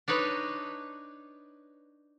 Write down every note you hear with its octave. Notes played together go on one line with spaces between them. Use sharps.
D4 D#4 B4 C#5